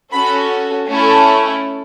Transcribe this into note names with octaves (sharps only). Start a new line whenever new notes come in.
C#4 F#4 A4 B5
A3 C#4 E4 A4